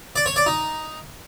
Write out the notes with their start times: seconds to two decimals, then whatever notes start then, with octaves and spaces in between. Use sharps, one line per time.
0.16 D5
0.26 C#5
0.36 D5
0.46 D#4